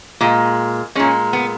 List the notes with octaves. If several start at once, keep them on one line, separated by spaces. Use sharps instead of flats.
A#2 G#3
A#2 G#3 C#4
B3